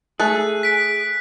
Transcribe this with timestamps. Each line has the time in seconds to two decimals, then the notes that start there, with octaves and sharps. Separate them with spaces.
0.20 A3 G#4 A4 F#6
0.63 B6 D7